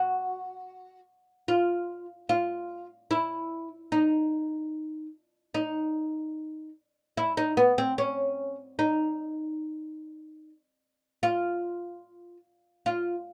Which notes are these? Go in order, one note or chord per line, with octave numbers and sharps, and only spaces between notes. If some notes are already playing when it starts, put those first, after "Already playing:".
Already playing: F#4
F4
F4
E4
D#4
D#4
E4
D#4
B3
C4
C#4
D#4
F4
F4